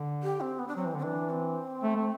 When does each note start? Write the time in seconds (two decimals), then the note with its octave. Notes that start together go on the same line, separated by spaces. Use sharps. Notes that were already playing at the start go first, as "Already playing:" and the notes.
Already playing: D3
0.23 G4
0.41 C4
0.59 B3
0.68 D4
0.76 F#3 C4
0.86 E3
0.94 D3 C4
1.03 E3 D4
1.30 C4
1.83 A3
1.96 A3